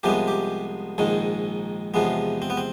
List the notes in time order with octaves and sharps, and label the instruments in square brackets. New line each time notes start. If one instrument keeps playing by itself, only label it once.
[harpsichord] C2 C3 F3 G#3 B3 G4
G4
A#1 G#2 D#3 G#3
E2 C3 F3 G#3 B3
C4
B3
C4